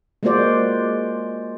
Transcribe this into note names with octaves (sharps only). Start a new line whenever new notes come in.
G#3 A#3 F4 F#4 C5 D5